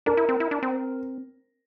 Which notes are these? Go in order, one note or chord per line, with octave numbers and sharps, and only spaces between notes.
D4 A#4
E4
C4
E4
D4
C4